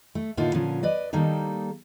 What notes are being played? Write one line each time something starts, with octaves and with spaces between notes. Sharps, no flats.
A3
A2 D3 A#3 D#4 F4 F#4
A#2 D3 F3 C#4
B4 D5 D#5
D#3 G3 A#3 D#4 A4